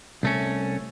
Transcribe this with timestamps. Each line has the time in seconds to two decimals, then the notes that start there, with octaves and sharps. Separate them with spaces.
0.23 C2 A3 C#4